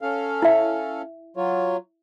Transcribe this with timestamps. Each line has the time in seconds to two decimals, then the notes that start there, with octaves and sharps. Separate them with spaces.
0.02 C#4 A4 F5
0.42 E4 E5
1.37 F#3 F4 C#5